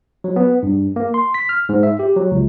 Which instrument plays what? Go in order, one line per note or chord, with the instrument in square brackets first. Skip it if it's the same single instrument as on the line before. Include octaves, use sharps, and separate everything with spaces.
[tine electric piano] F#3
B3
G2
A#3
C6
B6
F6
G#2
E5
G4
F#3
C#2